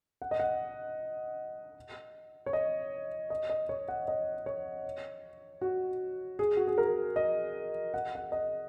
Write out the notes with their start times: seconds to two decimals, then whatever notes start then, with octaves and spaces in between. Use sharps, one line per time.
0.22 F#5
0.31 D#5
0.40 F#5
2.46 C#5
2.53 D#5
3.30 D#5
3.50 D#5
3.69 C#5
3.88 F#5
4.08 D#5
4.46 C#5
5.61 F#4
6.39 G#4
6.57 F#4
6.67 G#4
6.78 A#4
7.16 D#5
7.94 F#5
8.15 F#5
8.32 D#5